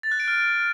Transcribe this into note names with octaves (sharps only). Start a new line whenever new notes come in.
A6
F#6
D7
F6